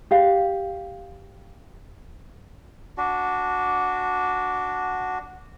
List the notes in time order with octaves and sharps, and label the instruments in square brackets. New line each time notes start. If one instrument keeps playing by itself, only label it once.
[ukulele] G4 F5
[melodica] D4 F#4